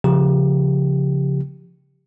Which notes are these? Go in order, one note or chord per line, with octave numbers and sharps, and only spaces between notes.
C#3 F3 G4